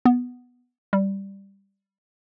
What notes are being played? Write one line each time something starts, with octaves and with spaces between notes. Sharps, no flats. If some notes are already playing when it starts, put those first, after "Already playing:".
B3
G3